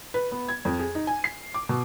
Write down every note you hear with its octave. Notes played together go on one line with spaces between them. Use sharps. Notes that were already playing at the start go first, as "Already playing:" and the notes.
B4
B3
G#6
F2
G#4
D#4
G#5
C7
D6
B2